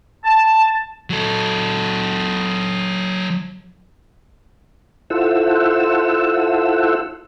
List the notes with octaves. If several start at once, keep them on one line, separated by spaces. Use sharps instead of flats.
A5
F#3 A4
E4 F4 A4 C5 F#5 E6